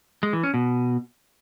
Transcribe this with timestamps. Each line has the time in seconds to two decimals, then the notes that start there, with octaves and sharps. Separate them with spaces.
0.23 G#3
0.33 E3
0.43 C#4
0.54 B2